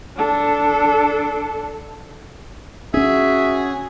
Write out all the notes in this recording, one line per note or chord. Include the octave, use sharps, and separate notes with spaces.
D4 A4
C4 C#4 F#4 G#4 E5